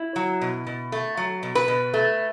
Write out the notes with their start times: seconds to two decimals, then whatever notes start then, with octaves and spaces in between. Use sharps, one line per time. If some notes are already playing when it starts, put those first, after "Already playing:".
Already playing: E4
0.16 F#3
0.41 B2
0.67 B2
0.92 A3
1.17 F#3
1.43 B2
1.55 B4
1.68 B2
1.94 A3